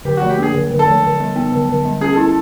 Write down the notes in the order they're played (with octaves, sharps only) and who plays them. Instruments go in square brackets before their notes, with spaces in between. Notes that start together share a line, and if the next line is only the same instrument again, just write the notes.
[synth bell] D3 [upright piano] G4
[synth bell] F3 [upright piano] F#4
[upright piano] G4
[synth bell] A#3 [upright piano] G#4
[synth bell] D3
D3
[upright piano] A4
[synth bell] F3
D3
G3
B3
D3
D3
G3
[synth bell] C#4 [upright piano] G#4
[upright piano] A4
[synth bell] E4
[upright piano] A4